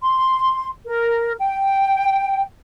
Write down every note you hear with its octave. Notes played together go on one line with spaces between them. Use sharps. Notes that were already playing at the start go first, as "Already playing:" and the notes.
C6
A#4
G5